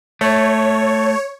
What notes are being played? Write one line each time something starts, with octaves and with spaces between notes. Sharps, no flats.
A3 C#5